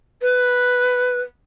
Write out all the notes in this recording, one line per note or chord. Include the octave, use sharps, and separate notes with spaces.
B4